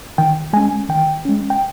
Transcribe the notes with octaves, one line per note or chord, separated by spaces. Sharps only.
D#3 G5
G#3 C#4 G#5
D#3 G5
G#3 C#4
G5